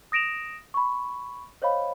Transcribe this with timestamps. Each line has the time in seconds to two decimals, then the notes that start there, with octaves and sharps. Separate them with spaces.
0.12 D#6 A#6 D7 E7 F7
0.74 B5 C#6
1.62 C5 C#5 D#5 F5 B5